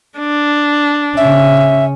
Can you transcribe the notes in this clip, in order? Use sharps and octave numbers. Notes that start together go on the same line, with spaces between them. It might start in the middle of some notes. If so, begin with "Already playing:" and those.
D4
C#3 C#4 E5